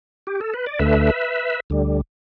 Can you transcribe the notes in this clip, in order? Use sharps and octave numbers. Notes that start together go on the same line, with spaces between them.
G4
A4
B4
D5
D2 D3 A3 B4 E5
D2 D3 G3